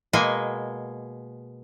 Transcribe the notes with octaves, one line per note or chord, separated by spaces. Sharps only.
B2 G#3 A#3 G#5